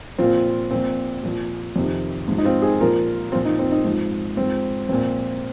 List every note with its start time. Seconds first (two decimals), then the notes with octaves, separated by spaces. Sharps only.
0.18 A#2 F3 C4 F4
0.71 A#2 F3 C4
1.23 A#2 F3
1.76 F2 C3 D#3
2.28 G#2 F3
2.38 D#4
2.45 C4 F4
2.62 D#4 G#4
2.80 A#2 F3 F4 A#4
3.32 A#2 C4 F4
3.36 F3
3.45 D#4
3.59 C4
3.72 D#4
3.84 G#2 F3
4.37 G#2 F3 C4
4.89 A#2 F3 C4